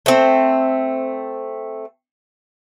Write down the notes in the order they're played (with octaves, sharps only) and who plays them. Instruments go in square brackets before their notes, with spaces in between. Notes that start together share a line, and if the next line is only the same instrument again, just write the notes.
[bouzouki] A3 C4